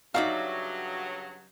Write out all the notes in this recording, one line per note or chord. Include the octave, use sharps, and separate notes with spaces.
G2 C#3 F#3 D#4 F#4 D5 E5 F5